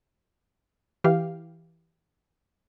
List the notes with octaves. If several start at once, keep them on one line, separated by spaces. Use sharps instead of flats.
E3 G4 F5